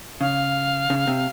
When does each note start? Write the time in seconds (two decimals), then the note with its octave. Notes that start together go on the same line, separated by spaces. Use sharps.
0.21 C#3 F5
0.90 C#3
1.07 C3